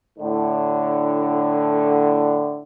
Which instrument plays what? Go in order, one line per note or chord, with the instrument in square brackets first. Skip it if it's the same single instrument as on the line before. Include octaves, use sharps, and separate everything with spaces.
[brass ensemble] A2 D3